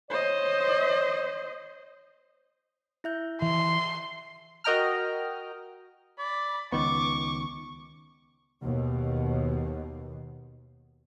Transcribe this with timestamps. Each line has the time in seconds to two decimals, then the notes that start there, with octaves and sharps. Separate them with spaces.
0.10 C5 C#5 D#5
3.04 E4 E5 G6
3.42 E3 E5 C6
4.64 F#4 A#4 D#5 G5 A#5 F6
6.19 D5 B5
6.72 C#2 D#3 B3 C#6 D6
8.63 D#2 B2